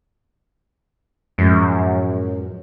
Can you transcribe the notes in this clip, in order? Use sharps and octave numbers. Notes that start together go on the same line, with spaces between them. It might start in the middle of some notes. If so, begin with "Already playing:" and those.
F#2 A2 F3 G#3